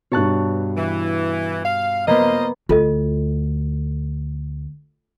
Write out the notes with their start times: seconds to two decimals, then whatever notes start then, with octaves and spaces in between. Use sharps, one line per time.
0.12 G2 B2 C#5 A5 F#6
0.77 E3
1.65 F5
2.08 A#3 B3 F4 C5 D#5
2.69 D2 F4 A4 D#5